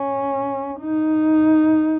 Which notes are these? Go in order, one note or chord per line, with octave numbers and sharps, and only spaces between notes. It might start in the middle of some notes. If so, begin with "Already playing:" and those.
Already playing: C#4
D#4